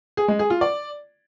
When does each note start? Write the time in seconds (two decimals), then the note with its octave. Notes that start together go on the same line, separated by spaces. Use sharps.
0.17 G#4
0.28 G#3
0.39 G#4
0.50 F4
0.61 D5